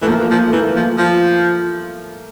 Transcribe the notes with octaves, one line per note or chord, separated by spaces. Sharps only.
E3 A3
F3 A#3
F3
A3
E3 A#3
F3
F3